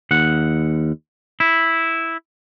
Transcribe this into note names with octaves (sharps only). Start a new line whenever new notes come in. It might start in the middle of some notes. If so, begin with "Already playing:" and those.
D#2 F#5
E4